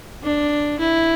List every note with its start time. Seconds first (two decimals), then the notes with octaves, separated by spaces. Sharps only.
0.23 D4
0.79 E4